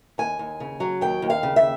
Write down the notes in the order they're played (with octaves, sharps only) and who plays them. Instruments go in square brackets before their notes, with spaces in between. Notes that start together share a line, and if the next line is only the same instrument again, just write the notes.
[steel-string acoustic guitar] D#2 G#5
D#2
C#3
F#3
D#2 G5
D#2
F5
C#3
E5